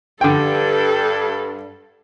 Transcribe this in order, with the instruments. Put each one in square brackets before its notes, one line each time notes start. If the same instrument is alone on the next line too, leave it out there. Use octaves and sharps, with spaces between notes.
[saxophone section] G2 [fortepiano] D3 G5 [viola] A4